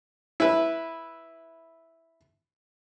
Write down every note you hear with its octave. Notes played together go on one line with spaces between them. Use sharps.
E4 B4